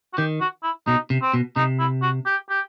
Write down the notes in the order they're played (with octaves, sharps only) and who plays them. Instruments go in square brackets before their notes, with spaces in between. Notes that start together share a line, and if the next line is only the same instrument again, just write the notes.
[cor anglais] F#4
[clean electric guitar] D#3 [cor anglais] G4
[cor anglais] F#4
E4
[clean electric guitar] B2 [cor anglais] D#4
[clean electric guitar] C3
[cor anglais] C4
[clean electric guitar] B2
[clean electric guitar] C3 [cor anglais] D#4
[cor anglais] E4
F#4
G4
G4